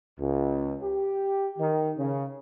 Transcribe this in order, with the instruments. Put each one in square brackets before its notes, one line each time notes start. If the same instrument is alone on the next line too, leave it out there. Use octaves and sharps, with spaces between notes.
[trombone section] C#2
G4
D#3
C#3